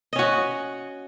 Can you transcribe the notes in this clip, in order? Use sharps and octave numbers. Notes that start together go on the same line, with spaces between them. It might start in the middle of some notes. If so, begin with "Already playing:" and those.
C#4 F#4 D#5